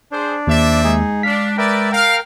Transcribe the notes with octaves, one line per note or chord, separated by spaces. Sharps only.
D4 G#4 C5
D#2 C5 D5 E5
G#3 D#4 G#4
D4 F5 B6
A#4 B4 D5 E5 G5
A#4 F5 G5